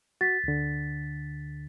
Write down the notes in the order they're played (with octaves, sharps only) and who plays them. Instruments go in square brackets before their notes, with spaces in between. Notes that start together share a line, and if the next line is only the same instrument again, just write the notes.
[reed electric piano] F#4 [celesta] A6 B6
[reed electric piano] D2 D3